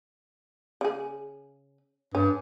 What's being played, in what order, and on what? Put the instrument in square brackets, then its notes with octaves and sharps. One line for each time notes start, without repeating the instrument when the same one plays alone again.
[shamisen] C#3 G#4
[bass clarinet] G2 [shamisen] C#4